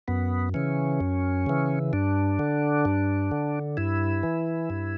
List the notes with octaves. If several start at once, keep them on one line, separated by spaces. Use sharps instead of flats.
F#2 B3
C#3 E3 C#4
F#2
C#3 E3
G2 D4
D3
G2
D3
G2 E4
E3
G2